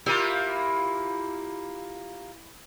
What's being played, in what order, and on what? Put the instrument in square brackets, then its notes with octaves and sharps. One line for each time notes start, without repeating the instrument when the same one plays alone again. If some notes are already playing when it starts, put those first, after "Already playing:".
[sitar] A#3 F4 G4 [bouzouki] E4